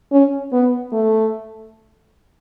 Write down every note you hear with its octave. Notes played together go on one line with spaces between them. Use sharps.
C#4
B3
A3